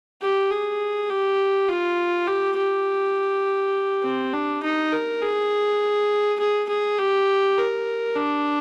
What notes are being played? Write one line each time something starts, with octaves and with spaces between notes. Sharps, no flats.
G4
G#4
G4
F4
G4
G4
C4
D4
D#4
A#4
G#4
G#4
G#4
G4
A#4
D4